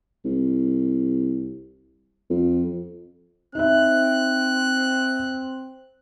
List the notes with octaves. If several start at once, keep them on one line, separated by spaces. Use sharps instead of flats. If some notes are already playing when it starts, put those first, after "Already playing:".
C2
F2
C4 D#4 E5 F#6